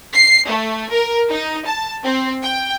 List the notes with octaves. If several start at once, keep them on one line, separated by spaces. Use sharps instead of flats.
C7
A3
A#4
D#4
A5
C4
G5